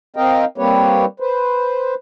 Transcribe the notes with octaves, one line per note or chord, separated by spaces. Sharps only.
C4 A#4 D#5 F5 G5
G3 A#3 C4 G4 B4 C#5
B4 C5